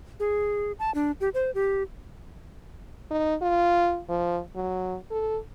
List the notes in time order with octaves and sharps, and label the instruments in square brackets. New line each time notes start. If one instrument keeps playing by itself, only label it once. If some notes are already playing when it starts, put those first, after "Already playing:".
[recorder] G#4
A5
D4
G4
C5
G4
[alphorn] D#4
F4
F3
F#3
A4